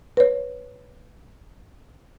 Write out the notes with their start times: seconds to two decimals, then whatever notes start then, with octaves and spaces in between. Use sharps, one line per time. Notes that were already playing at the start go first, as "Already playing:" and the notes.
0.17 B4 C#5